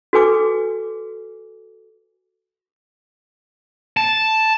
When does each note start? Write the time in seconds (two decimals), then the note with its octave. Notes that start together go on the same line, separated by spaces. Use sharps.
0.13 F#4 A4 B4 G#5 D6
3.97 A5